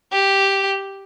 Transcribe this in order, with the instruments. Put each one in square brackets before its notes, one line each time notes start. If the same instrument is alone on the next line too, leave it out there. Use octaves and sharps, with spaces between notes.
[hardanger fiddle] G4